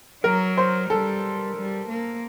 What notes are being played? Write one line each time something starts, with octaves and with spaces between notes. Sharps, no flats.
F#3 A#4
C5
G3 A4
G3
A#3